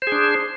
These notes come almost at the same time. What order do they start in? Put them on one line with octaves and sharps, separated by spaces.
C5 G#4 D4